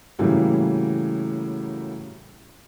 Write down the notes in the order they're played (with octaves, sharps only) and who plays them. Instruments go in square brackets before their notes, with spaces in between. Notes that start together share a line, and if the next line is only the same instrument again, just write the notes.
[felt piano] A2 C#3 E3 F#3 G3 A#3